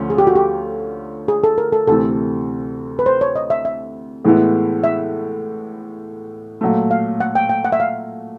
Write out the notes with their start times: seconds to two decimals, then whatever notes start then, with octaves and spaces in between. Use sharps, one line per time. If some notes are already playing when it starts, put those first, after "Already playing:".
Already playing: D2 D3 F3 A3 C#4
0.10 G#4
0.18 G4
0.27 F#4
0.36 G4
1.28 G#4
1.44 A4
1.58 A#4
1.72 A4
1.87 D2 C3 E3 A3 A4
2.99 B4
3.06 C5
3.21 C#5
3.36 D#5
3.50 E5
3.65 E5
4.25 A2 E3 G#3 B3 E4
4.84 E5
6.61 A#2 F#3 A3
6.91 F5
7.20 F#5
7.35 G5
7.49 G5
7.65 F#5
7.72 E5
7.80 F5